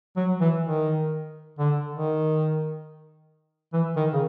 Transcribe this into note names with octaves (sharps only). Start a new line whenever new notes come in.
F#3
E3
D#3
D3
D#3
E3
D#3
C#3